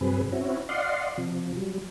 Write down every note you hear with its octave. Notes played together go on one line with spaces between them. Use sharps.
G2 C3 F#3 C4 G#4 B4
C4 C#4 E4 F#4
D5 D#5 F5 F#5 C6
C3 F3
F#3 G3